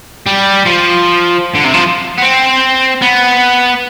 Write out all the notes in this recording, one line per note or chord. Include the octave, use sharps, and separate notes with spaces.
G3
F3
D3
C3
F3
B3
C4
B3